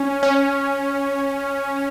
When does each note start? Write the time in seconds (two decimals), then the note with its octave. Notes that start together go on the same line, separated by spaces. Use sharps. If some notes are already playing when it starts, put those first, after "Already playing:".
Already playing: C#4
0.23 C#4